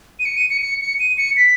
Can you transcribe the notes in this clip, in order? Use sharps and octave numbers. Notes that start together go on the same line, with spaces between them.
D#7
C#7
D#7
C#7
C#7
C#7
D#7
C#7
B6